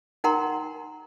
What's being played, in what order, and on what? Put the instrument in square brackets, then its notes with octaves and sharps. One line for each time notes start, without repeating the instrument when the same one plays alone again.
[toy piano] D#4 A#4 F#5 G5 A#5 C6